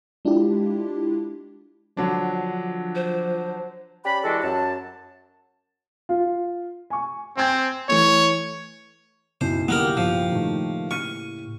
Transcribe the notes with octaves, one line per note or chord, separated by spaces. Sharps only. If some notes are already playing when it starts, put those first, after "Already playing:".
G#3 D4 E4 F4 G4
D3 F3 F#3 D4
C5
C#4 G4 D5 B5
E3 G3 G#3 D4 F#4 A4
F#2 A5
F4
G#5 C#6
C4 G5 G#5 G#6
E3 A3 C#5
B1 F#2 C#3 E4 C5
D#3 A#3 B3 D#4 G4 A#4
G2 F3
A2 D#3 A3
C#6 F6 D#7